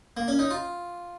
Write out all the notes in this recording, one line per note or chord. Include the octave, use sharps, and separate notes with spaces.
A#3
C#4
D#4
F4